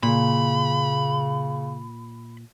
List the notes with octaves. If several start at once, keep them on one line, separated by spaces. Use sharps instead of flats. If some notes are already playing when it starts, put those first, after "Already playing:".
A#2 C#3 B5